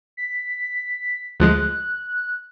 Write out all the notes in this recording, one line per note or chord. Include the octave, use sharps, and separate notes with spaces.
B6
D2 F3 G#3 F#6